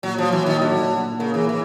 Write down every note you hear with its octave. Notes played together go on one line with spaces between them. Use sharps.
A#2 F#3
F3 F#3
E3
A#2 D#3
D3 F#3
A#2
A#2
C#3 A#3
A#2 E3
E3